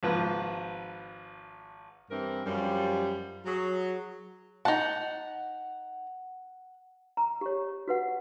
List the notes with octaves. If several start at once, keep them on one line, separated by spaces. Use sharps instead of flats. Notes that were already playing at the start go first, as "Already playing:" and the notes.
G#1 F3 B4
G2 E3 C4 A#4
F#2 F3 G3
F#3 G#4
D#4 F#5 A5
A#5
G4 C#5
F#4 B4 F#5